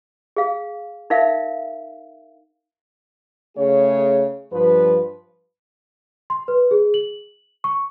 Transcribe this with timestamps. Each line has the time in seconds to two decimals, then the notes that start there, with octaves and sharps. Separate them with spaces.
0.36 G#4 F5
1.10 D#4 A#4 E5 F5
3.57 C#3 A3 G#4 C#5
4.53 G2 F3 B4
6.30 C6
6.48 B4
6.71 G#4
6.94 F#7
7.64 C#6